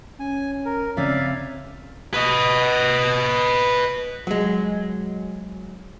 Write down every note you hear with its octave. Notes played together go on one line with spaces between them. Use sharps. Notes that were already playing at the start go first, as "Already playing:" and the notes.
C#4 G#5
A#4
C#3 C4 C#4 D5 E5 F5
B4 D#5
F#3 G#3